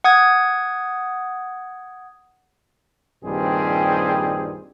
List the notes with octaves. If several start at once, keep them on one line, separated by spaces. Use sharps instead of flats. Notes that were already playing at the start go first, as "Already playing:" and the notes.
F#5 D#6 G#6
A#1 G2 D#3 G3 C4 G#4